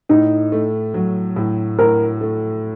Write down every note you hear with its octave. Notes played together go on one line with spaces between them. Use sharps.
A2 D#4
A3
F#3
A2
A2 A#4
A3